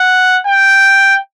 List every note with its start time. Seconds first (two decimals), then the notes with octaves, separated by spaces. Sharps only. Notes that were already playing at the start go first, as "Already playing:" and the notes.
Already playing: F#5
0.47 G5